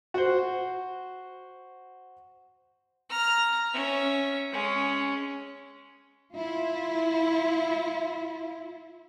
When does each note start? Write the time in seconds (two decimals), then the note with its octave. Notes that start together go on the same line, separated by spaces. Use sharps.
0.14 F#4 C5
3.09 A#5 F6
3.73 C#4 E5
4.52 G#3 C#4
6.33 E4 F4